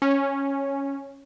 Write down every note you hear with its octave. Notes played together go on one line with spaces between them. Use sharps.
C#4